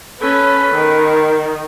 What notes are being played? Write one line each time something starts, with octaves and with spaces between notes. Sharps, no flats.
C#4 A4 B4
D#3